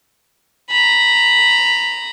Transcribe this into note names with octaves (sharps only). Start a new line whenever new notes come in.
A#5 B5